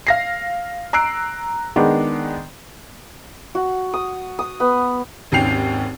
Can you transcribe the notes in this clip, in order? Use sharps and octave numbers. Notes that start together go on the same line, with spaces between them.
F5 A#6 C7
A#5 E6 F#6 C7 D7
D#3 G#3 B3 D4
F#4
D#6
D#6
B3
G#1 D#2 C#4 G5 C7 F7